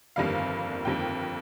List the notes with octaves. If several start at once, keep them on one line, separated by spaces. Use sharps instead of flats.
G1 F2 D#3 G3 A#3 F5
G1 F2 D#3 G3 A#3 G5